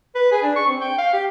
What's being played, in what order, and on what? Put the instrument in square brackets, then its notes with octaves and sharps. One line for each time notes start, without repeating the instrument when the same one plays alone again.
[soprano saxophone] B4
G#4
D4
C#6
C4
G5
F5
G4